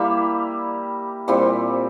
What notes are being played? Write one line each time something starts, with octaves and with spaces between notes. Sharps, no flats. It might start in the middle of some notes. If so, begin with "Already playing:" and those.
Already playing: G3 A#3 E4
A#2 G3 C4 E4